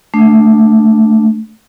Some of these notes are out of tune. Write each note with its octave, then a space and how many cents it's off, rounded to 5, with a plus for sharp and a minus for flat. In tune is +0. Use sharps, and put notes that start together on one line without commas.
A3 +0 D4 +0